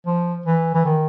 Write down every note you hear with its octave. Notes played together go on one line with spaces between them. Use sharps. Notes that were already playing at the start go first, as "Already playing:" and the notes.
F3
E3
E3
D#3